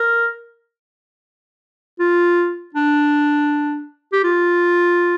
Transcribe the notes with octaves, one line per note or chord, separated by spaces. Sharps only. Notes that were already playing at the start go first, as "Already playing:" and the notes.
Already playing: A#4
F4
D4
G4
F4